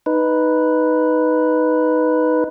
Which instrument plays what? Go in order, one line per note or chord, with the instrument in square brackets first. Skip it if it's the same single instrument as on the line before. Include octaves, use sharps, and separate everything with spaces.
[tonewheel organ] D#4 B4